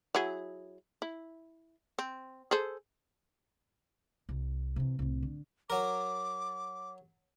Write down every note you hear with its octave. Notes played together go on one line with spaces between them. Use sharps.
F#3 E4 G#4
E4
C4
G#4 A4 C5
C2
C3 E3
C2 A2
D3
F#3 A#4 D6